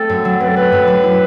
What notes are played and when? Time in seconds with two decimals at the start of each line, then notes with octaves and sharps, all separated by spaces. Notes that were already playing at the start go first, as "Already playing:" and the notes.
Already playing: A3 C4 A4
0.09 F#2
0.25 F#3
0.40 C4 B4
0.48 A4
0.56 A3 B4
0.72 F#2
0.87 F#3
1.04 E4